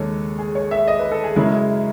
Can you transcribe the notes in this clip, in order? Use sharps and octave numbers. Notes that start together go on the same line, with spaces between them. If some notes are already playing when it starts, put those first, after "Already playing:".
Already playing: D#2 C#3 G#3 A4 C#5
G#4
C#5
E5
D#5
B4
A4
G#4
F#2 C#3 G#3 E4